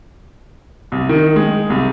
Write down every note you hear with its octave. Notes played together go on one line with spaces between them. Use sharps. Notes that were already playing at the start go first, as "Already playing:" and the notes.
C2
D#3
G#3
C2